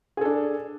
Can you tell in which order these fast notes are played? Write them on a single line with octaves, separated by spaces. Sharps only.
G#4 A4 D4